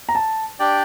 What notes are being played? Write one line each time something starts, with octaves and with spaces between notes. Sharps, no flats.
A#5
A5
D4 G4 D5 G5